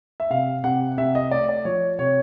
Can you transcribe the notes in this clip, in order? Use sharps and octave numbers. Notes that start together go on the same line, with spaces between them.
E5
C3 F5
C3 F#5
C3 E5
D#5
A3 D5
D5
F3 C#5
C3 C#5